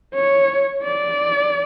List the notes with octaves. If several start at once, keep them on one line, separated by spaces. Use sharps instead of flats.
C#5
D5